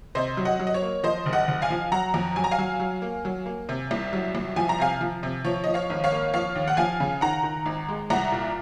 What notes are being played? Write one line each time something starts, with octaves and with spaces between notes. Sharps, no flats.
C3 C5 D#5
F#3
D#5 F#5
F#3
D#5
C#5
A#3
F3 C5 D#5
F#1
D#5 F#5
F#1
F5 G#5
F3
F#3 F#5 A#5
F2
F#3 G#5
A#5
F5 G#5
F#3
F#3
A#3
F#3
A#3
C3
C2
F#3
C2
F3 G#5
A#5
C3 F5 G#5
F3
C3
F3 C#5
F3 D#5
C#5 F5
G#1
C#5 F5
A#3
F3 C#5 F5
D#2
F#5
F3 F5 G#5
C#3
D#3 F#5 A#5
D#3
G#1
G#3
C2 F#5 A#5
A#2